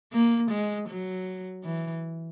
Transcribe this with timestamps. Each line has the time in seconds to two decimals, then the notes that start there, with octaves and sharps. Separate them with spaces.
0.13 A#3
0.51 G#3
0.89 F#3
1.64 E3